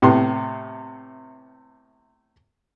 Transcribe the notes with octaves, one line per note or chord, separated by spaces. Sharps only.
A2 C3 B3 C6